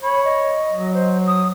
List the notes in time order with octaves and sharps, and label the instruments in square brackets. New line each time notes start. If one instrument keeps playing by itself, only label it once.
[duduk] C#5 [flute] B5
[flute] D#5
[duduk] F#3
[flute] C5
D#6